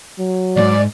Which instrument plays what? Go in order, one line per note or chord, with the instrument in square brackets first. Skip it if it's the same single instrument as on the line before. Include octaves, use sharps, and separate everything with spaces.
[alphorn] F#3
[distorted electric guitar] D2 G#2 [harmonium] D5